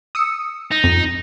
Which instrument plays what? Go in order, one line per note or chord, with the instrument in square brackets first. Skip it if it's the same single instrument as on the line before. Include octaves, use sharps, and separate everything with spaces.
[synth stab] D#6 E6 C#7
[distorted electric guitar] D#4
[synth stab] F2